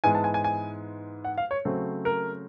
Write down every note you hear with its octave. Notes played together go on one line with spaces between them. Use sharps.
G#2 E3 G#3 B3 G#5
A5
G#5
G#5
G#5
F#5
F5
C#5
C#3 F#3 A3 C4
A#4